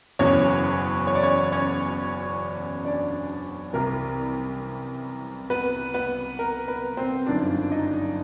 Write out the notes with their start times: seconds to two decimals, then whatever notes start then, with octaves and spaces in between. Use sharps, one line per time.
0.19 F#1 E2 B2 C#4 C#5
1.07 C#5
1.15 D5
1.23 C#4 C#5
1.52 C#4 C#5
2.85 D4 D5
3.73 C2 C3 E3 A#4
5.50 B3 B4
5.94 B3 B4
6.39 A#4
6.68 B3 B4
6.97 C4 C5
7.27 G1 F#2 D#3 D4 D5
7.71 D#4 D#5